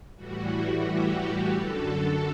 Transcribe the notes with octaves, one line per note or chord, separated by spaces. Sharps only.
A2 E3 G3 F#4
G4
F#4
F#2 D3 F#3 A4